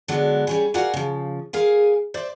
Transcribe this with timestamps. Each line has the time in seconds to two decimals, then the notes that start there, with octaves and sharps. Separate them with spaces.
0.08 D3 F#3 G#3 B3 D4 F#4
0.47 G3 C#4 G#4
0.74 F#4 A#4 D5 F5 F#5 G#5
0.94 C#3 F3
1.53 G#4 A#4 F5 G#5
2.14 C5 D5 E5